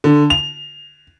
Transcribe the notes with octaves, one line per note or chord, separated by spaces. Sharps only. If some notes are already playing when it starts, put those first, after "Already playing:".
D3
F7